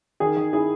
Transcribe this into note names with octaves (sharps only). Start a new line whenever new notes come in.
D#3 G#4
D#3
E4 G#4